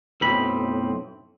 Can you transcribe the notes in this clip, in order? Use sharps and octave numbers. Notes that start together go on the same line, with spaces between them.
B1 F#2 A2 C4 B5